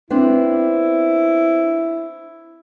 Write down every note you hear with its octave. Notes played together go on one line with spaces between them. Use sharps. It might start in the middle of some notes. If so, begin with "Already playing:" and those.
B3 C4 D4 E4